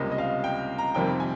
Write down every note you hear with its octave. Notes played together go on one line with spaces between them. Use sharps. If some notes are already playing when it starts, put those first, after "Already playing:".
Already playing: C#2 C3 G3 A#3 D#5
D#5
F5
G5
A#5
F2 C3 D#3 G3 A#3 G5
G#5